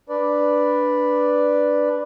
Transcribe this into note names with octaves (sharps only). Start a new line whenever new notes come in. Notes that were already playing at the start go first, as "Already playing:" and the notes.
D4 B4 D5